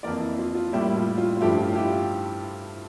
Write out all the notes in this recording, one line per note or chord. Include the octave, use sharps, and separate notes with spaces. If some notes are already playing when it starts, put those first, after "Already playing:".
F2 E3 A#3 A#4 D5
E4
F4
F4
A2 G3 A#3 E4 G4
E4
F4
F4
F4
G2 F3 A3 E4 G4
F4
F4
E4 G4